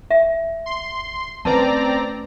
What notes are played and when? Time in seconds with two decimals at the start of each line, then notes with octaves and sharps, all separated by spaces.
0.11 E5
0.66 C6
1.45 A3 C4 C#4 B4 D5 A5 A#5